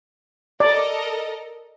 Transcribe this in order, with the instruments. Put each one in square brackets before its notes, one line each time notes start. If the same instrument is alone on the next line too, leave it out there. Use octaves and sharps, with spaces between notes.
[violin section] A4 A#4 D#5 [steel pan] D5